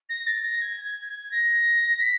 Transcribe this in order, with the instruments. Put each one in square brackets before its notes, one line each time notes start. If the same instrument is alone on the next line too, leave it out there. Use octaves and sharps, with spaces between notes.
[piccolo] A#6
A6
A#6
G#6
G#6
G#6
A#6
B6